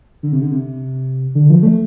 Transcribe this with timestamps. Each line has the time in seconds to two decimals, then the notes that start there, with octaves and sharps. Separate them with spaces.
0.23 D3
0.32 C3
0.42 D3
0.51 C3
1.35 D3
1.50 F3
1.63 A3